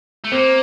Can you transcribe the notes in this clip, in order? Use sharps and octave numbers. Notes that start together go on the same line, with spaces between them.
A3
A#3 C4